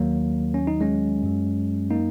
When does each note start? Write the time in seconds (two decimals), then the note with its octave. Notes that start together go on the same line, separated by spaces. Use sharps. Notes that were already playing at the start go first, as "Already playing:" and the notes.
Already playing: D#2 D#3 F#3 A#3
0.54 C#4
0.67 D#4
0.81 G#3 C#4
1.23 F#2 F#3
1.91 A#3 D#4